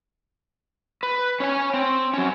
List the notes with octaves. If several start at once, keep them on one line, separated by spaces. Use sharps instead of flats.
B4
C#4 C#5 G#5
C4
F#3 C#4